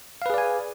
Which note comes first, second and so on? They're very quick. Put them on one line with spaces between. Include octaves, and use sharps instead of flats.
F5 B4 G#4 D5 G#5